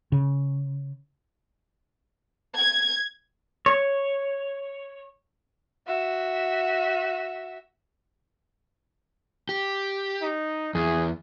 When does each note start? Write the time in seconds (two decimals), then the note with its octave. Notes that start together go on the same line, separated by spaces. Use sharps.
0.12 C#3
2.56 G#6
3.66 C#5
5.87 F#4 E5
9.49 G4
10.22 D#4
10.75 E2 G#4